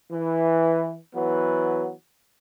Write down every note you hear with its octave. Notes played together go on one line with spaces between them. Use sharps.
E3
E3 F#3 B3